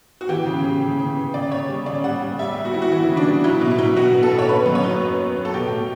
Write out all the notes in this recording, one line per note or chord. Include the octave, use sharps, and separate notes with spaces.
F#4
E3 G4
C#3
C#3
C#3
C#3
B3
C#3 D5
C#3 C#5
G3
C#3 D5
G3 F#5
G3
G3 E5
G3
F#4
G3 E4
F#4
E3 E4
C#3
D4
G3
F#3 E4
B2
E4
F#3
B2 F#4
B3
A4
B2
C#5
B3 B4
F#2
C#5
F#3
B3
B3
F#3
A4
B2 G4
A3